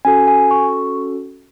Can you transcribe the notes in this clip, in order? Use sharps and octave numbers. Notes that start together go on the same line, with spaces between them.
C#4 F#4 A4 G#5
G#5
C#6